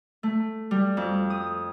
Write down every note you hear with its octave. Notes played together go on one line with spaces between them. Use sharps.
A3
G3
F2
D#6